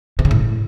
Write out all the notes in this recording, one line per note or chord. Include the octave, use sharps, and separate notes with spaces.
C3
C#3
A2